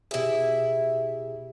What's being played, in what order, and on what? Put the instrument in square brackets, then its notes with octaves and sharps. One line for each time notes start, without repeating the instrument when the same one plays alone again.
[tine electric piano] B2 G4 G#4 [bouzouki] E4 E5